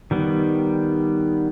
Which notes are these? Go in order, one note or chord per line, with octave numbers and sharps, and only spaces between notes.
D#3 G3 B3